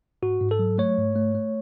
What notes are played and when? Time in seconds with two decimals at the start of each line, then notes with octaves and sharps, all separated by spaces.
0.22 G#2 F#4
0.41 G#2
0.51 A4
0.59 F#3
0.78 A3 C#5
0.98 G#2
1.15 A3
1.35 A3